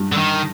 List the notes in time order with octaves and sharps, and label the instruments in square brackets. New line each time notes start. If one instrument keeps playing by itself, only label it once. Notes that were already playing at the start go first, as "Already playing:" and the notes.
Already playing: [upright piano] G2
[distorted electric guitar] D3
D#3